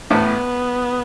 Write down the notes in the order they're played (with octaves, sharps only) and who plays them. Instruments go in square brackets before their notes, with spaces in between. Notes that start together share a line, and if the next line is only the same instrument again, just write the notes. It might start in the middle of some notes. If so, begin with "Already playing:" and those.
[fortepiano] A1 A2 [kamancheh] B3